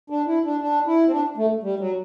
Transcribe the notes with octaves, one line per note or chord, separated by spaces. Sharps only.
D4
E4
D4
D4
E4
C4
D4
A3
G3
F#3